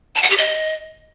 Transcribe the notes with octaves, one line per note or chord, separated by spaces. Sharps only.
A5
F#5
G4
D#5